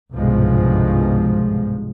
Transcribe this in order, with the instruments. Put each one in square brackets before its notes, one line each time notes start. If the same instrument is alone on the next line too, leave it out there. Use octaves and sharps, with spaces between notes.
[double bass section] G1 C2 G#2 B2 F3 G#3